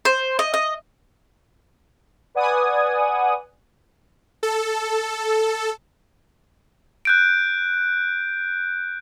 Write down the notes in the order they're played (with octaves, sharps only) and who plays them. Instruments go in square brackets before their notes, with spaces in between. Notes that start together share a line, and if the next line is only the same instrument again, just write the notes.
[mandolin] C5
D#5
D#5
[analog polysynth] B4 D5 F#5 G#5 D#6
[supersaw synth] A4
[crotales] F#6 G6 D7